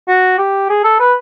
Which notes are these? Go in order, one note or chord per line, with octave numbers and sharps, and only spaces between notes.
F#4
G4
G#4
A4
B4